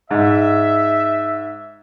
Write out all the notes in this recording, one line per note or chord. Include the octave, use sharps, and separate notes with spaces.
G#2 E5